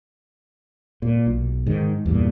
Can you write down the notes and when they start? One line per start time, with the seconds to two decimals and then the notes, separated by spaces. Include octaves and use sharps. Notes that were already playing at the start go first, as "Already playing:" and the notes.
1.02 A#2
1.26 B1
1.66 G#2 D#3
2.06 E2 G2 A#2